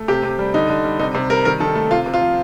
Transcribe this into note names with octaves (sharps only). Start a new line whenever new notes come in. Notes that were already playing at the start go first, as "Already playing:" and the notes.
Already playing: A3
C3 G4
C3
G3
D3 D#4
D3
G3
C3 D#4
C3
G3 A#4
D#3 A#4
D#3 A4
A3
C3 F4
C3
F4
F3